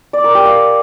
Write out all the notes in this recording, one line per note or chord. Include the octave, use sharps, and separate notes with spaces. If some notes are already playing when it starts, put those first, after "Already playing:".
D5
A#4
G4
F5